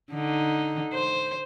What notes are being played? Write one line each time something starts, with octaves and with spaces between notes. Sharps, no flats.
D3 D#4
C5